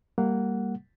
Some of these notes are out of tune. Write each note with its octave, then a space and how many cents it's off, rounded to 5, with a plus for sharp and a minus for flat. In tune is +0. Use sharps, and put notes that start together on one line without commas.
G3 +0 A#3 -15 F#5 +0